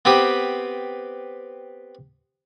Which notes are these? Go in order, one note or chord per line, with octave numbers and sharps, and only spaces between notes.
B3 C4 G4 B4